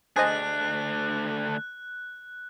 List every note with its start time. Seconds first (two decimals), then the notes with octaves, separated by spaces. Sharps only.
0.16 D2 D4 G#4 C5 D#5 F#6